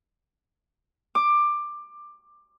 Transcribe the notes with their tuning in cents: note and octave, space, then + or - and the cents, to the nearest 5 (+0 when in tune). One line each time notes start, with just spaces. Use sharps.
D6 +15